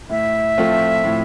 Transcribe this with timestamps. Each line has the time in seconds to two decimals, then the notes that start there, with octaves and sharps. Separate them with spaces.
0.10 A2 E5
0.58 F3 A3 C4 F4
1.04 A2